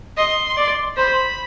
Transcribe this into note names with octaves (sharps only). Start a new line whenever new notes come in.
D#5 C6
D5
C5 B5